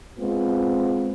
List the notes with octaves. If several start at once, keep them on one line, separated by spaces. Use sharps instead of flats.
G#3 B3 C4 F4